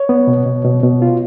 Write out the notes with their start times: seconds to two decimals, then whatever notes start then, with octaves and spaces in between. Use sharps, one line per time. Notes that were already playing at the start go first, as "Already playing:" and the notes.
Already playing: C#5
0.09 B3
0.27 B2
0.46 B2
0.65 B2
0.83 B2
1.02 F4